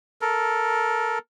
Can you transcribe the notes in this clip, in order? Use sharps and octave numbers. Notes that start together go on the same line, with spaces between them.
A4 A#4